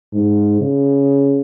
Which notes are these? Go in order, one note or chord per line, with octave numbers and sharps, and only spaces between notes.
G#2
C#3